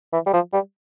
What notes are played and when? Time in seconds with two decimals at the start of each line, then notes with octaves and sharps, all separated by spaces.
0.13 E3
0.26 G3
0.33 F3
0.53 G3